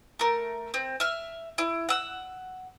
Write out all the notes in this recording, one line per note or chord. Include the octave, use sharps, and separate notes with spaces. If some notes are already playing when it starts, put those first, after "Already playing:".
A3 A#4
C4
E5 F6
E4
F#5 E6